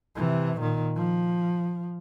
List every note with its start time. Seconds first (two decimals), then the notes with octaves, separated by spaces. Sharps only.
0.16 C3 E3
0.58 A#2 D#3
0.96 F3